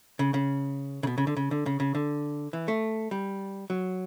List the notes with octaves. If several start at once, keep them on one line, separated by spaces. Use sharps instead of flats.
C#3
C#3
C#3
B2
C#3
D3
C#3
D3
C#3
C#3
D3
E3
A3
G3
F#3